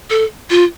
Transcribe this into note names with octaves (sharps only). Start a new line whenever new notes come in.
A4
F4